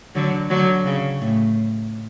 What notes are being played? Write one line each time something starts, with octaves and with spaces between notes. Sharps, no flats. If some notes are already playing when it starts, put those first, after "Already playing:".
D3 F#3
D3 F#3
C#3
A2